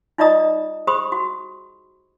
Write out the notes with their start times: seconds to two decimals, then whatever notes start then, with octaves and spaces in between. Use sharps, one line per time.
0.18 D#4 F4 D5 D#5 A#5 D#6
0.87 G4 G#4 C5 B5 C#6 D#6
1.12 F#4